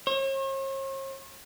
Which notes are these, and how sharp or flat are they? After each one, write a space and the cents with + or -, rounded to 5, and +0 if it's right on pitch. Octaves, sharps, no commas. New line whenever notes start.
C#5 -45